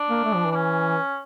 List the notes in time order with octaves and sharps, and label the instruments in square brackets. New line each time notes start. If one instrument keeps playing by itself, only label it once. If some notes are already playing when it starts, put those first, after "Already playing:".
Already playing: [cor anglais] D4
[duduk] A#3
A3
F3
E3
[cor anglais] D4
C#4